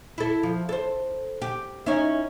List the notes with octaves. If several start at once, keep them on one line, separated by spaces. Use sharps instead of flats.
E4 A4
F3
A4 C5
G4
C#4 D#4 E4